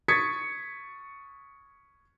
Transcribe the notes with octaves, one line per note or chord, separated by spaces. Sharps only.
C#6 D#6 G#6 A6 B6 C#7